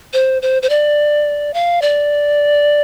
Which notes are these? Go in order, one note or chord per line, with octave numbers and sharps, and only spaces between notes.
C5
C5
C5
D5
F5
D5